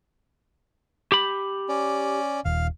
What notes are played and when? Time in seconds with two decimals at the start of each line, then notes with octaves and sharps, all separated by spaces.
1.12 G4 B5
1.69 C#4 D5
2.45 D#1 F5